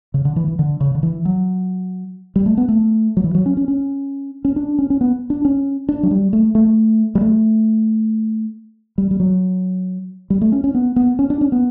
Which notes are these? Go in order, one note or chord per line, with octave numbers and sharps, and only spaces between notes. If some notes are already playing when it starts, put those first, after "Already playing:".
C#3
D3
E3
E3
D3
C#3
D3
E3
F#3
G3
A3
B3
A3
F#3
E3
F#3
C#4
C#4
C#4
C#4
D4
C#4
C#4
B3
D4
C#4
D4
F#3
G3
A3
A3
G3
A3
G3
G3
F#3
G3
A3
C#4
C#4
B3
B3
C#4
D4
C#4
B3